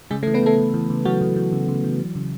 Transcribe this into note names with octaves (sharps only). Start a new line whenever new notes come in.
C#3 G#3 G#4
A3 A4
E3
B3 B4
E3 A3 A4
E3
E3
C#3
E3 F#3 F#4
E3
E3
C#3
C#3
E3
F#3
C#3